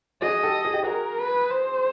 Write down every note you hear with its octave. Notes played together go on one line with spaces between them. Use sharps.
F#4 G#4 D#5
G4 A4
G#4
G4
F#4 G#4 A#4
B4
C5